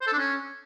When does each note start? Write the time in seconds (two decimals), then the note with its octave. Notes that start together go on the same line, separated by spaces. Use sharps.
0.01 C5
0.07 A4
0.13 D4
0.19 C#4